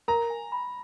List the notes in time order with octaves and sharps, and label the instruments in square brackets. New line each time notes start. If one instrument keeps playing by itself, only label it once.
[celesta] A#4 [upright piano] A#5
[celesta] G#5
B5